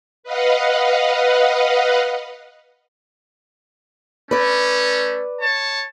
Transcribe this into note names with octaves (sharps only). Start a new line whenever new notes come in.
B4 D#5 F5 F#5
A3 C#4 B4 D5
C#5 A5